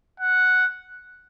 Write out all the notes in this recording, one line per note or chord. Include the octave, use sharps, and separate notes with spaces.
F#5